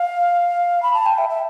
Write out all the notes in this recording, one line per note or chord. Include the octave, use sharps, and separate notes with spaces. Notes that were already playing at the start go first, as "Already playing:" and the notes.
Already playing: F5
B5
A5
G5
E5
E5